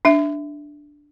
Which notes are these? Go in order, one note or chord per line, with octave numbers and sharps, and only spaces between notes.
D4 E5